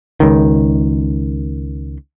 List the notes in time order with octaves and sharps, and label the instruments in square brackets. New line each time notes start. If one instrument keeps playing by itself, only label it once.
[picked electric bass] C#2 D#3